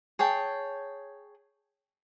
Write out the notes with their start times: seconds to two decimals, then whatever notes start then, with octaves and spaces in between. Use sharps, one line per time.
0.19 G#4 C#5 G5 A5